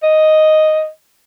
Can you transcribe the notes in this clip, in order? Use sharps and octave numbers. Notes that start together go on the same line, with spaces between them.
D#5